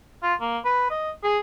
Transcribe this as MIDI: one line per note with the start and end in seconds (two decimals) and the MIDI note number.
0.23 0.34 65
0.41 0.58 58
0.65 0.88 71
0.90 1.11 75
1.24 1.39 68